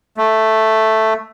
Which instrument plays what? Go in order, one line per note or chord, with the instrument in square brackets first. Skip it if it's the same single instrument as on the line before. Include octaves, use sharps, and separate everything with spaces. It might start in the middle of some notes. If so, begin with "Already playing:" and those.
[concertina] A3